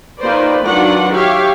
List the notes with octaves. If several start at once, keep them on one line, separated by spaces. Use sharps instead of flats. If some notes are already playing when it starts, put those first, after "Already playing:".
D#3 A#3 F4 B4 C5 D5
D#3 F#3 D4 F4 B4 F#5
G4 C#5 E5 F5